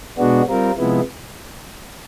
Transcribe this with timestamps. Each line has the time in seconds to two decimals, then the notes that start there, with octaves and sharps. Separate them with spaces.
0.18 B2 G#3 B3 D4 F#4
0.48 G3 C4 F4 A#4
0.77 C3 F3 G#3 B3 E4